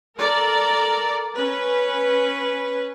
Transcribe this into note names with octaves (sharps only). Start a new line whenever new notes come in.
A4 A#4 D5
C#4 B4